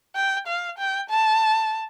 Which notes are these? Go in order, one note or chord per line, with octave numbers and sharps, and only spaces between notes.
G5
F5
G5
A5